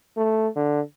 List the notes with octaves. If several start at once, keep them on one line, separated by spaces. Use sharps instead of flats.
A3
D3